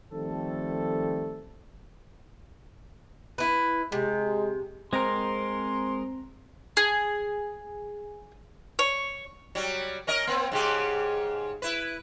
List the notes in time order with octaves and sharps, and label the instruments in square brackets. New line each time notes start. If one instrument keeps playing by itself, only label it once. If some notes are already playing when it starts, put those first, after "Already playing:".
[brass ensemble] D#3 F3 G3 A3 C4 A4
[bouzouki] E4 B4
[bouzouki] C3 [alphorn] G#3
[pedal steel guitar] G#3 A#4 [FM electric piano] C4 C5 A#5 [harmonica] C6
[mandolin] G#4
C#5
[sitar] F#3 G3
C#4 A#4 D#5
A#3 C4
G#2 C#3 G4
E4 B4